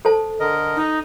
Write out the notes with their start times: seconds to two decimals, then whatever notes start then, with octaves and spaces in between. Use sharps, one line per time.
0.05 A4 C5 A5
0.40 D3 A#4 D#5
0.76 D#4